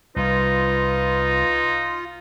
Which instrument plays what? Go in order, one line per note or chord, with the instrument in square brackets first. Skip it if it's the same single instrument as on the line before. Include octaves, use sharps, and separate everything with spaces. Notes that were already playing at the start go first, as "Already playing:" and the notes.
[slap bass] C2 [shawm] D#4 [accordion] F4 [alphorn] B4